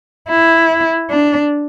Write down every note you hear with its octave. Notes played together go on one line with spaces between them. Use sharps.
E4
D4